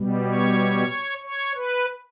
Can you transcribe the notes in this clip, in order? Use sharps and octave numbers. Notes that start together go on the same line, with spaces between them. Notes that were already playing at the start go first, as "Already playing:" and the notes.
Already playing: B2 G3
C#5
C#5
B4